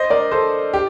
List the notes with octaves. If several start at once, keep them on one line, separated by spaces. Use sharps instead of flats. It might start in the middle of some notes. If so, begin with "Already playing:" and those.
Already playing: C5 D#5
A#4 D5
A4 C5
G4